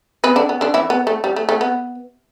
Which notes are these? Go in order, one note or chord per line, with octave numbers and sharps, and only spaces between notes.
B3 B4
D3 D4
B3
D3 D4
E3 E4
B3
A3
G3
A3
A3
B3